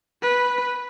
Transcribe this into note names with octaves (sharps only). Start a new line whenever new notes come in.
B4